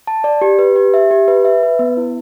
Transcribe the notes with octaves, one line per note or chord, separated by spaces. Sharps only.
A5
D5
G4
B4
G4
E5
G4
B4
E5
B4
B3
E4